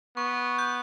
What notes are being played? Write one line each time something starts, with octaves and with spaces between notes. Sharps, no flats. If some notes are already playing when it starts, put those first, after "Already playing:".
B3 C#6
G6